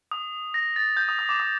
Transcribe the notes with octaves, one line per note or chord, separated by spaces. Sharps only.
D#6
A#6
A6
G6
D#6
D#6
D6
D#6